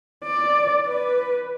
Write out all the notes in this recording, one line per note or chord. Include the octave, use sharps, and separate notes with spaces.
D5
B4